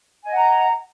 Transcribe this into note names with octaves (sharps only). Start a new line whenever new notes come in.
D#5 F#5 G#5 A#5